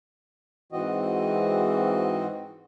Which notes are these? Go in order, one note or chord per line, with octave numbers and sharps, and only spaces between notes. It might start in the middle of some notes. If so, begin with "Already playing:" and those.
G#2 E3 C4 F#4 D#5